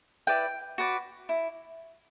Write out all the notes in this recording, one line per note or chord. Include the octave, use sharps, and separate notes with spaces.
E4 B4 D5 G5
F#4 B4 D5
E4